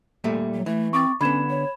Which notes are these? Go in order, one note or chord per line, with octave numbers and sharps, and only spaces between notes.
A#2 G3 A3
F#3
E3 A3
C4 C#6 D6 A6
D3 B3 C#4 B5 G#6 E7
C#5